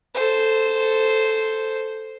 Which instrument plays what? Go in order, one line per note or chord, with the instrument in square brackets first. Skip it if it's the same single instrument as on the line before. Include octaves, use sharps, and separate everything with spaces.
[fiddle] A4 C5